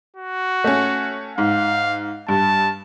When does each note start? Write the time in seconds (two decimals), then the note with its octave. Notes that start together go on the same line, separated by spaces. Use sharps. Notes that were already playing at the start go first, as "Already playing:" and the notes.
0.17 F#4
0.64 A3 C#4
1.38 G#2 F5
2.29 G2 A5